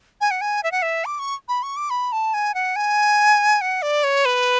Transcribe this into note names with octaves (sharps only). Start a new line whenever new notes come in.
G#5
F#5
G#5
E5
F#5
E5
D6
C#6
B5
C#6
D6
B5
A5
G#5
F#5
G#5
F#5
D5
C#5
B4